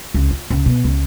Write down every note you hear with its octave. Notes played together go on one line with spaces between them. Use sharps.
C#2
F4
C#2
B2
C#2